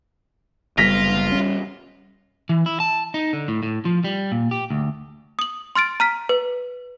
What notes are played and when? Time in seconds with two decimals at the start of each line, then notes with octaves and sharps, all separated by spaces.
0.78 F#1 G3 B3 F4 A#6 B6
1.32 G3 C#4
2.49 E3
2.66 E4
2.80 A5
3.14 D#4
3.33 D3
3.48 A2
3.63 A2
3.85 F3
4.04 G3
4.32 A#2
4.51 G4
4.70 D2
5.39 D#6 F#7
5.75 C6 F6 A6 D7
6.00 A#5 F6 B6
6.29 B4